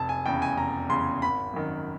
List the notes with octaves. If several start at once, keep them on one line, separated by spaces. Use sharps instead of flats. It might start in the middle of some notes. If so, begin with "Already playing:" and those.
Already playing: F1 A5
G#5
E2 C#3 G5
G#5
F1 A#5
E2 C#3 C6
G#1 B5
F#2 D#3